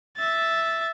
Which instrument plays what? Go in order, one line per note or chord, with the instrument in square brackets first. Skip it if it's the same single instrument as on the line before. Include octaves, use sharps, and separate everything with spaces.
[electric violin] E5 A6